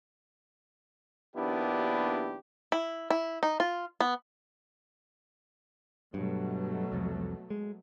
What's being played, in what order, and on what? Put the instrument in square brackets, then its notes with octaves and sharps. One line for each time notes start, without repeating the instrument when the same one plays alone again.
[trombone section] A#1 D#2 B3 D4 E4 G4
[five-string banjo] E4
E4
D#4
F4
B3
[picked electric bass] G2 [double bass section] B2 F#3 A3
[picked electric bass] C2 F2
G#3